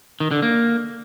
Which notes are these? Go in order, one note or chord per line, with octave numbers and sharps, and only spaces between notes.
D#3
D3
A#3